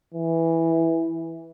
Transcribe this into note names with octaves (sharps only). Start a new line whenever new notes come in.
E3